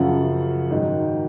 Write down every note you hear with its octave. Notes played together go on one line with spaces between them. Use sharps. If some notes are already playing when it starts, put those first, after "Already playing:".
Already playing: F#2 C#3 F3 F#5
G#2 D#3 F#3